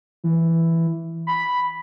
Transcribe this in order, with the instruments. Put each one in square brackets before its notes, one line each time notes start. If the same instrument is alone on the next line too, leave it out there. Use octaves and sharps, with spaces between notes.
[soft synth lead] E3
B5